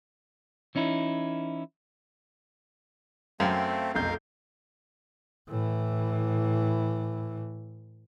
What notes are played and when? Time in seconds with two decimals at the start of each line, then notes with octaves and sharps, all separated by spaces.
0.75 E3 C#4 D#4 E4
3.40 F#2 A3 C4 F5 G5
3.95 F1 B1 A#4 F5 G6
5.49 A2 E3